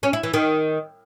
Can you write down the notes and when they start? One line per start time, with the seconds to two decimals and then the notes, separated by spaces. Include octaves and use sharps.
0.03 C#4
0.13 E4
0.23 E3
0.34 D#3